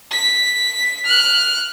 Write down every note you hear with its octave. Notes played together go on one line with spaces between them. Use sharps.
B6
F6 F#6